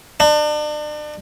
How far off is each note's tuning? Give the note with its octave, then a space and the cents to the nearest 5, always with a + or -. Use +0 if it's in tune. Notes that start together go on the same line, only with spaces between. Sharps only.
D4 +40